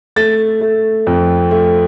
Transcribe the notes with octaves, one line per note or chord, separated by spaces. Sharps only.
A3 A6
A3
F2
A3